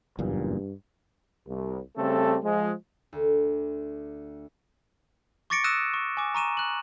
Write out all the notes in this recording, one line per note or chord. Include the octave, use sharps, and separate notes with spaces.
F#1 E2 G2 A#2
C2
C#3 G3 A3 C4 A4
F3 G#3
D2
C#6 D6 A6 A#6 C#7 D7
D#6 E6 F#6 A#6 D#7 E7
C#6
G#5 D6
A#5 C#6 D#7 E7
F#6 F#7